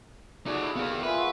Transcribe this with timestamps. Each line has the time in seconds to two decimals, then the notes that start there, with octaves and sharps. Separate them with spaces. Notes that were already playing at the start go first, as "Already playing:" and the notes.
0.46 A3 D#4 F#4 G#4 D5
0.63 E4
0.76 A#3 B3 G#4 F5
0.90 A#2 D3 G4 F5
1.03 F4 G#4 B4 E5
1.17 F#5 C#6 E6